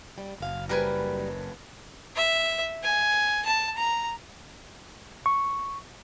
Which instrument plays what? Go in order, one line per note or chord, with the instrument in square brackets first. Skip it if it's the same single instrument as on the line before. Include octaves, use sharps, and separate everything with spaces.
[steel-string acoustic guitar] G3
[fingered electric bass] F#1 [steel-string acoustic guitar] F#2 F5
[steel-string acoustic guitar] F#2 G3 [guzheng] A#4 B4 G#5
[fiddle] E5
G#5
A5
A#5
[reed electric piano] C#6